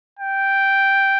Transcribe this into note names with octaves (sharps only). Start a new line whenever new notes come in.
G5